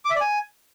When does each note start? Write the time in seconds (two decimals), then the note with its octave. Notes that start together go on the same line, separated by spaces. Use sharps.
0.05 D6
0.10 E5
0.16 D5
0.21 G#5